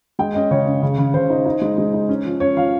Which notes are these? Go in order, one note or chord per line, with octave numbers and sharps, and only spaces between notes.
G#3 G5
C#4 D#5
C#3 C#5
C#4
C#3
C#3
C#3 C5
D#4
D#4
G#3
G#3
D#4
C#4
F3
C#4 C#5
F3 F5